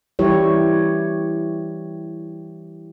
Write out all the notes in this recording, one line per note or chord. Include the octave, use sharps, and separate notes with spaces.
E3 G3 E4 G4 C#5